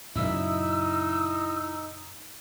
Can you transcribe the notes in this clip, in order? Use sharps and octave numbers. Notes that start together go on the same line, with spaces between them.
F#2 A#2 C#3 D#4 E4 E5 E6